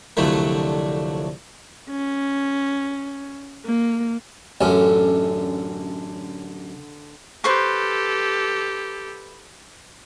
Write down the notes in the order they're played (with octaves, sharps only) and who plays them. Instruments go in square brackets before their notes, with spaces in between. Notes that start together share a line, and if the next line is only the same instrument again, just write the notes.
[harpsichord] C2 F2 D3 F#3 A3
[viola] C#4
A#3
[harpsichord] A1 F#2 C#4 [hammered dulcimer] D3
[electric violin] G4 A4 [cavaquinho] B4 C5 C#6